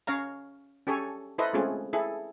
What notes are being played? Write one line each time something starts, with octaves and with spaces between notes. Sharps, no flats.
C#4 C#5 F5 A#5
C#4 G4 A4 C#5 G#5
E4 A4 B4 C5 D#5
G#3 A3 C4 C#4 F4 G#4
E4 G#4 A4